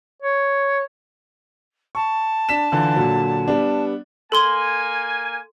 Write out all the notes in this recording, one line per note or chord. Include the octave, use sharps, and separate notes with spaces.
C#5
A5 C#6
D4 B6 E7
D3 E3 F4
A#2 D3 F#3
G3 B3 D4
A#3 A4 G#5 C6 G7